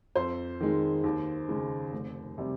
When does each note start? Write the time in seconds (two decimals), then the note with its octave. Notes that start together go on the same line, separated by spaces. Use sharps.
0.15 F2 C5
0.60 D#3 G#3
1.04 D#2
1.49 C#3 G#3
1.93 F1
2.38 C3 G3